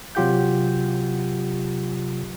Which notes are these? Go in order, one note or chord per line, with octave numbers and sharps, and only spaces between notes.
C3 F#3 F4 G4 F#5 G6